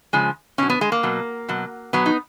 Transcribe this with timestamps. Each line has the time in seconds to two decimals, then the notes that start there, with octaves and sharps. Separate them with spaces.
0.13 C#3 F3 G#3
0.58 B2 F#3 C#4
0.70 B3
0.81 G#3
0.92 A#3
1.03 B2 F#3
1.48 B2 F#3
1.93 B2 F#3 B3
2.06 D#4